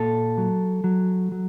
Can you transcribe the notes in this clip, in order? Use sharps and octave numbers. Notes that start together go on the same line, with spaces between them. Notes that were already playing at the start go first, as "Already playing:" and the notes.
Already playing: A#2 A4
F#3
F#3
F#3